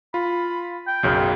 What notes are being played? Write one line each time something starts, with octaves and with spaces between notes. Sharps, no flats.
F4 B5
G5
B1 F#2 C#3